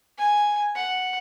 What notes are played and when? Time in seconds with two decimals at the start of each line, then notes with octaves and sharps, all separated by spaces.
0.18 G#5
0.75 F#5